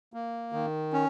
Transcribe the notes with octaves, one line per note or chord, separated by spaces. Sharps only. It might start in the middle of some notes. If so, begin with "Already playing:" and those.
A#3
D#3
C#4